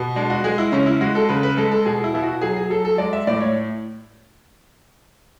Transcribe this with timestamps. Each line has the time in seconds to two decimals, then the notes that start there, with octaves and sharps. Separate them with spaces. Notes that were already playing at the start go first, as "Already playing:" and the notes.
Already playing: B2
0.16 G#3 D4
0.30 F#4
0.44 G#3 G#4
0.58 E4
0.72 C#3 C#4
0.86 E4
1.01 G#3 F#4
1.15 A4
1.29 C#3 B4
1.43 B4
1.57 G#3 A4
1.72 A4
1.85 B2 G#4
2.04 E4
2.14 B2 E4
2.23 F#4
2.42 F#3 G#4
2.57 G#4
2.70 F#3 A4
2.85 A4
2.98 G#3 D5
3.13 E5
3.27 A2 D5
3.41 C#5